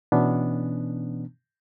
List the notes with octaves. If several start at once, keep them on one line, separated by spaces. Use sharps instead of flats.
B2 E3 B3 C#4 D4